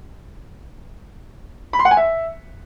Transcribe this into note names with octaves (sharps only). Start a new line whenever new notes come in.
B5
C6
F#5
G#5
E5